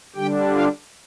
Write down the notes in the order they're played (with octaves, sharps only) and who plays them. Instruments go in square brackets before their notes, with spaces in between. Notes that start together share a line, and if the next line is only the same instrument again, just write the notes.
[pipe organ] D3 G3 D4 G4 G5
F4 F5